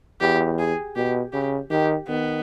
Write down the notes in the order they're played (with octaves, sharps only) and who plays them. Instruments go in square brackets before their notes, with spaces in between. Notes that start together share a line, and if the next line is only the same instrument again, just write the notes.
[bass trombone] E2 [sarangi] G4
[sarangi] G#4
[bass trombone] B2 [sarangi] G4
[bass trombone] C#3 [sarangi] G4
[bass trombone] D#3 [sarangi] G4
[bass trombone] D#3 [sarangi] B3